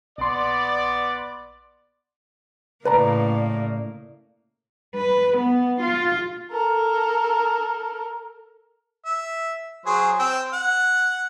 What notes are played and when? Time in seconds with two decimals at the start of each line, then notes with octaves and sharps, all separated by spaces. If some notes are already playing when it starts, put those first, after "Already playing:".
0.18 A#1 B3 D5 C6
2.85 A2 C#3 A#3 B4 D5 A5 A#5
4.95 B4
5.38 B3
5.81 F4
6.51 A4 A#4
9.05 E5
9.86 F#3 G#4 C5
10.19 C4 G5 E6
10.53 F#5